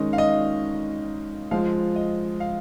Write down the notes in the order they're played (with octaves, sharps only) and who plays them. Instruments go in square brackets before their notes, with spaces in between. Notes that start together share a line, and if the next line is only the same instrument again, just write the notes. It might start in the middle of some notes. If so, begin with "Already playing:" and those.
Already playing: [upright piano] D#3 G#3 C#4 [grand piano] D#5
[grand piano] F5
D#5
[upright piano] F3 G#3 F4 [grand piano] F5
[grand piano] D#5
F5